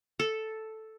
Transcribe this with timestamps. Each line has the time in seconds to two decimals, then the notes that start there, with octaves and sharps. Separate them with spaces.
0.20 A4